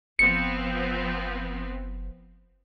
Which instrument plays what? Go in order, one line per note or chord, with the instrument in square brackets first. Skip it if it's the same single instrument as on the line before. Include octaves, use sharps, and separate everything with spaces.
[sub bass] F#1 [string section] F3 B3 C4 [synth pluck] C#7